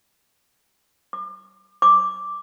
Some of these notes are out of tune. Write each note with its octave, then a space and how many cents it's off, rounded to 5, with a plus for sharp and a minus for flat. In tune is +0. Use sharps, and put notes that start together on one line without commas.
D6 +35
D6 -5